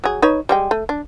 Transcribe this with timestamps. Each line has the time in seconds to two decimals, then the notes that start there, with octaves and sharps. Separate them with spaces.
0.04 F#3 G#4
0.22 D#4 B4 C#5
0.49 G3 G#3 G5
0.71 A3
0.89 D4